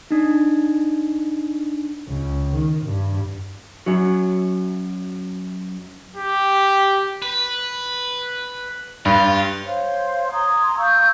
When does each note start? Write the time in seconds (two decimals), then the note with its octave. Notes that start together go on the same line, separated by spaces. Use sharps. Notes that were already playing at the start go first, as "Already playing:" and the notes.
0.11 D4 D#4
2.09 C#2
2.55 D#3
2.86 G2
3.86 F#2 F#3
6.17 G4
7.22 B4
9.05 G2 F4
9.65 C5 C#5 F5 C6
10.31 A#5 C6 D#6 G#6
10.77 F5 C#6 E6 G6